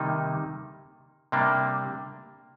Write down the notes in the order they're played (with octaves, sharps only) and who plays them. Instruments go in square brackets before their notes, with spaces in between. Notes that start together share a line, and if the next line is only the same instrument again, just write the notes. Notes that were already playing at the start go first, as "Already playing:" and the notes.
Already playing: [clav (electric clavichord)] C3 D#3 G3 A#3 D#4
C3 G3 A#3 D4